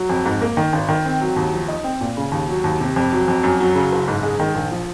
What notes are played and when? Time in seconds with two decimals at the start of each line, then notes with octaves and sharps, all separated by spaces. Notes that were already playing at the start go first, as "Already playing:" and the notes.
Already playing: F#3
0.10 F2
0.25 G#2
0.41 A#3
0.57 D#3
0.73 G#1
0.89 D#3
1.05 C4
1.21 F#3
1.36 D#2
1.53 F3
1.68 D#4
1.84 C4
2.01 A#2
2.17 C#3
2.32 D#2
2.49 F#3
2.64 D#2
2.80 C3
2.96 F2
3.12 F#3
3.28 F2
3.43 F#2
3.60 F#3
3.75 C#3
3.92 F#1
4.08 G#2
4.23 G#3
4.40 D#3
4.55 A#1
4.72 F3